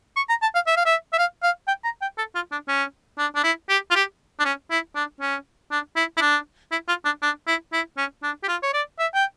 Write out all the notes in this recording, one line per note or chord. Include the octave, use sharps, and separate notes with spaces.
C#6
A#5
A5
F5
E5
F5
E5
E5
F5
F5
G5
A#5
G5
A4
F4
D4
C#4
D4
D4
E4
G4
F4
G4
D4
C#4
E4
D4
C#4
D4
E4
E4
D4
E4
F4
D4
D4
E4
E4
C#4
D4
G4
F4
C#5
D5
E5
G5